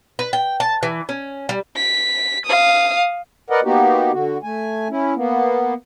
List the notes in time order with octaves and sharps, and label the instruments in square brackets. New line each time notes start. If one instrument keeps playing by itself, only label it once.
[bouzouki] B4
G5
A5
E3
C#4
G3
[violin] B6
F5 D#6
[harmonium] A#4 B4 D5 D#5 F#5
A#3 B3 D#4 F#4 G4
D3 F#4
A3 G#5
C#4 E4
A#3 B3